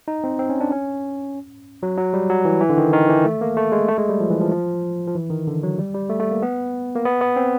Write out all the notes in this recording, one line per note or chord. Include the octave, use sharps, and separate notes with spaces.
D#4
C4
C4
C#4
D4
C#4
F#3
F#3
G3
F#3
E3
E3
D3
D#3
D#3
E3
A3
A#3
A3
G#3
A3
G#3
G3
F3
E3
F3
F3
F3
E3
D#3
D3
F#3
G3
G3
A3
A3
A#3
B3
A#3
B3
B3
C4